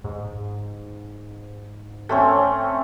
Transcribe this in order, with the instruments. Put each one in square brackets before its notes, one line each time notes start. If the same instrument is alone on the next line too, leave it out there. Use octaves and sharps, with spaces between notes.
[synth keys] G#2
[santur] A3 C4 C#4 [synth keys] G5